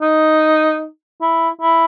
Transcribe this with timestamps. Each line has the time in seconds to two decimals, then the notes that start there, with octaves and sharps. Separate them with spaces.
0.01 D#4
1.21 E4
1.62 E4